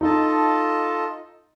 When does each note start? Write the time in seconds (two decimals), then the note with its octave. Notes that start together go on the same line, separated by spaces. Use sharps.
0.01 D#4 F4 A4 D#5 A5